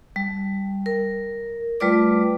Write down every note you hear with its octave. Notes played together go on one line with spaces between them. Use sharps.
G3
A#4
G3 A3 F4 B4 D5 D6